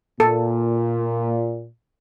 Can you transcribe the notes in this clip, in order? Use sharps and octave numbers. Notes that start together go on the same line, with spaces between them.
A#2 A4